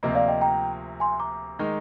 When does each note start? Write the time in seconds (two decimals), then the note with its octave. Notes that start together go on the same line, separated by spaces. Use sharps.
0.03 D2 C3 F3 A#3 F4 D#5
0.15 D5 F5
0.28 D#5 G5
0.41 G5 A#5
1.00 G#5 C6
1.20 A#5 D6
1.59 D#3 G#3 D#4 A#4